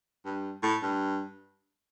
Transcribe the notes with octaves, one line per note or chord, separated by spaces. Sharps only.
G2
A2
G2